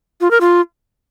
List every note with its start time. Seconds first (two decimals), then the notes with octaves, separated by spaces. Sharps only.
0.21 F4
0.31 A#4
0.41 F4